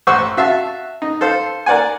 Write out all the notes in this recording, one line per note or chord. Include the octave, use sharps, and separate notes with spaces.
A1 C5 F#5 C#6 E6
F#4 E5 F5 A5
D#4
A4 C5 F5
A#4 D5 F#5 G#5